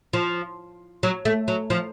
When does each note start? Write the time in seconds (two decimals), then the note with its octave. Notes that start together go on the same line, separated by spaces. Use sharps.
0.13 F3
1.03 F#3
1.25 A3
1.48 F#3
1.70 F3